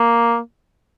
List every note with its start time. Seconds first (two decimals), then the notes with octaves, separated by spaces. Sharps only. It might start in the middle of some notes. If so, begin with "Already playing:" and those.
Already playing: A#3